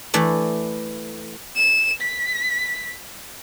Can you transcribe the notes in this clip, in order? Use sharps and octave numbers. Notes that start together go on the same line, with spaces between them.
E3 A3 D5
E7
B6